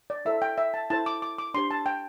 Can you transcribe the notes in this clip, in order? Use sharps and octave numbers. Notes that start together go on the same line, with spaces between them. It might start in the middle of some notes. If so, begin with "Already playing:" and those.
D5
E4 A4 C5 E5
G5
E5
A5
E4 A4 C5 A5
D6
D6
D6
D4 G4 C5 C6
A5
G5